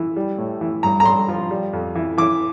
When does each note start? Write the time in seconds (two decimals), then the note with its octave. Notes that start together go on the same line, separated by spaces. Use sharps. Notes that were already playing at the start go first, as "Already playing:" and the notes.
Already playing: E3
0.16 G3
0.38 A2
0.61 E3
0.83 G2 A#5
1.00 A#5
1.06 G2 C6
1.29 F3
1.51 G3
1.73 F2
1.95 E3
2.18 E3 D6